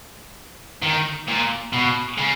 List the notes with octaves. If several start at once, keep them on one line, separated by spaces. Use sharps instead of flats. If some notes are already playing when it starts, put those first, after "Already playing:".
D#3
A#2
B2
C#3